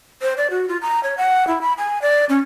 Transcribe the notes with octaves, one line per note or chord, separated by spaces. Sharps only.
C5
D5
F#4
F4
A#5
C#5
F#5
E4
B5
G#5
D5
C#4